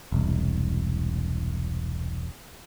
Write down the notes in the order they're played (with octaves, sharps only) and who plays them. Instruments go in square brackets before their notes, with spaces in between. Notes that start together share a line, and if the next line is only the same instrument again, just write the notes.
[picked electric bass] E1 C2